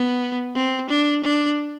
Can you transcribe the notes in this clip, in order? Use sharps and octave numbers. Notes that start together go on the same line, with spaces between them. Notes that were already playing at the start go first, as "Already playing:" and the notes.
Already playing: B3
C4
D4
D4